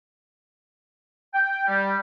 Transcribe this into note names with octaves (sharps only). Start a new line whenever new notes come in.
G5
G3